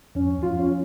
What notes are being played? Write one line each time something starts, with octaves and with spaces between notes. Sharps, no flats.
F2 C#4
F2 F4
C#4